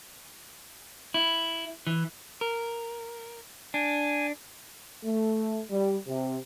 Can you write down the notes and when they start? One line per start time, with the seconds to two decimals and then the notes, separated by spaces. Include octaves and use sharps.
1.14 E4
1.87 E3
2.41 A#4
3.74 D4 G#5
5.04 A3
5.69 G3
6.06 C3